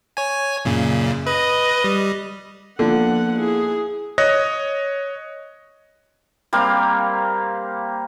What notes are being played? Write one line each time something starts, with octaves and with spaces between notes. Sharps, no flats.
C#5 G#5
F#2 A#2 C#3
B4 D#5
G3
D3 F3 A#3 B3 F#5
E4 G#4
C#5 D#5 D#6 F#6 A#6
G3 A#3 C4 F5